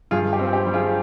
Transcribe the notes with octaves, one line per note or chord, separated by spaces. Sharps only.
G2 F4 G#4
G4
C4
G4
G3
F4 G#4